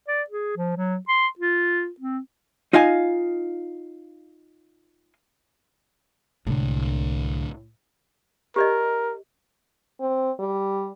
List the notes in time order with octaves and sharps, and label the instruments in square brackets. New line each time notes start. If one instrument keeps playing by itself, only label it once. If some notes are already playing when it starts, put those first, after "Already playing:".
[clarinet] D5
G#4
F3
F#3
C6
F4
C4
[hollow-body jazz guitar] D#4 F4 D#5 F5 G#5
[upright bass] C2 G#3 [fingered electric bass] A2 D3
[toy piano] G4 D5 D#5 [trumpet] A#4
[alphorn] C4
G3